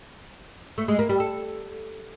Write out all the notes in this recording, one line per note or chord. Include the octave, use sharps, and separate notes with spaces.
A3
G#3
A#3
G3
A4